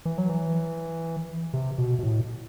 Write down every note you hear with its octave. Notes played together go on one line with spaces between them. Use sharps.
E3
F#3
E3
C3
B2
B2
A2